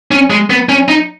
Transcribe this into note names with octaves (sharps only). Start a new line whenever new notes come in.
C#4
G#3
B3
C#4
D#4